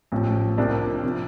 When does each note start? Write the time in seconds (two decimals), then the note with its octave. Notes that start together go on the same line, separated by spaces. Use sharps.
0.12 A1 A2 F3
0.57 C2 C3 F3 A#3 D4
1.03 C3 F3